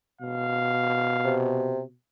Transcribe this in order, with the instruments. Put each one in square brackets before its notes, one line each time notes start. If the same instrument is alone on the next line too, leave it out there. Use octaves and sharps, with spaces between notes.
[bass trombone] B2 [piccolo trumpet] F5
[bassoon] C3